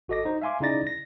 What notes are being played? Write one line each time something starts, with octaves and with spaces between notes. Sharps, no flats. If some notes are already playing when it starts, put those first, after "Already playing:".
G#1 F#4 A4 D#5 D6 A#6
D#4 C5
E5 F5 G#5 C6 D6
C#3 D#4 E4 D5 A6 A#6
A#6